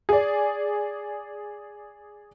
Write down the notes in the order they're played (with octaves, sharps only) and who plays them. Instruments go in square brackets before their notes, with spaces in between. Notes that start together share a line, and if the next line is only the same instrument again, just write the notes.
[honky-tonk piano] G#4 D5